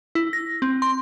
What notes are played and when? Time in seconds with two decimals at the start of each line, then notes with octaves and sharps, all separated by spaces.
0.15 E4
0.33 A#6
0.62 C4
0.82 C6